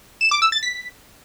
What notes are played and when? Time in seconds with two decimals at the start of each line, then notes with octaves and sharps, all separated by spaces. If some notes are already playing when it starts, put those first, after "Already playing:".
0.21 E7
0.31 D6
0.42 E6
0.52 A6
0.63 B6